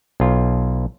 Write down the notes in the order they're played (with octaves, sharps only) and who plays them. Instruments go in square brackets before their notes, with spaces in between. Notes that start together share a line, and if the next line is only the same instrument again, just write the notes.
[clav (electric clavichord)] B1 F4